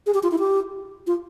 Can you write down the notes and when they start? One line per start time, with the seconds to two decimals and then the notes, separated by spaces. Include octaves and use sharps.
0.06 G#4
0.14 G4
0.23 F4
0.31 E4
0.39 G4
1.07 F4